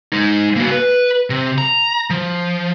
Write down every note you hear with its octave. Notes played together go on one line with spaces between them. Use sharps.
G#3 D#4
A#3 F#4
B4
C3
A#5
F3